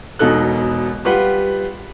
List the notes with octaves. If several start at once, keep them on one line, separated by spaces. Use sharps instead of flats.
E1 B2 D#4 A4 F#6
G3 F4 G4 B4 F#5